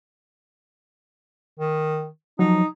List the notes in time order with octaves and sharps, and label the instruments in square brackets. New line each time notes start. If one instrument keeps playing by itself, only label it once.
[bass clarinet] D#3
[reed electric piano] F3 F#3 [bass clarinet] D#4